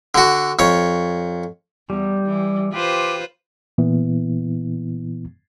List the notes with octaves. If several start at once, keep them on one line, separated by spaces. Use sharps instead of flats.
D3 F#4
F2 C#5
E2 G3
E3
F4 G4 B4 C5
A#2 E3 B3 E4